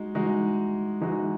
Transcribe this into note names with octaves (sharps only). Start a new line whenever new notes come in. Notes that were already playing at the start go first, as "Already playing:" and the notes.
Already playing: G#3 D#4 F#4
E3 G#3 D#4 F#4
E3 G#3 D#4 F#4